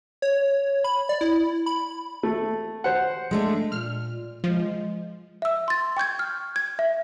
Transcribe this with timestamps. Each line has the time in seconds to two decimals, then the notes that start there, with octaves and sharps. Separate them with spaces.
0.22 C#5
0.84 B5
1.09 D5
1.21 E4
1.66 B5
2.23 A3
2.84 C5 F#5
3.31 G#3 A3 D4
3.72 A#2 F6
4.44 F3 G#3
5.42 E5 E6
5.68 C6 A6
5.97 G5 C#6 G6 G#6
6.19 F6
6.56 G#6
6.79 E5